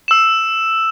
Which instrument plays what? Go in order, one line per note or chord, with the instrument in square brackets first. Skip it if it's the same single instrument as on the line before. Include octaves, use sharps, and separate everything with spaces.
[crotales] E6 E7